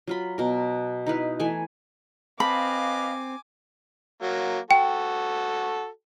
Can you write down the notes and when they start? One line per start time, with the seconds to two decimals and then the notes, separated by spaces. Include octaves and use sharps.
0.07 F#3 F4 B5
0.38 B2 A#4
1.06 D#4 E4 B4 F5
1.40 E3 A3 G#5
2.40 C4 B4 D#5 F5 G#5 B5 D6
4.22 F#3 A#3
4.71 F#4 A4 G5